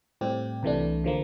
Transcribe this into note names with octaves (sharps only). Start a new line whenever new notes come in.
A2 G3 C4 G4
C2 C3 E3 A3 D4
D3 F3 A#3